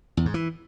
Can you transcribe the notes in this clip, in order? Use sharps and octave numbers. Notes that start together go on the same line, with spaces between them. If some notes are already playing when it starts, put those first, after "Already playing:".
E2
G#2
E3